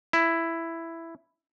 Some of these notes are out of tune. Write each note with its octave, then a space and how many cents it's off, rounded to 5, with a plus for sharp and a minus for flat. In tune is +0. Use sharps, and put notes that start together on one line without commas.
E4 +5